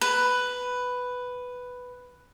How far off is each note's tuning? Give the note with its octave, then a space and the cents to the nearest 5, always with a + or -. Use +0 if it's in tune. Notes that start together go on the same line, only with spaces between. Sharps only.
B4 +5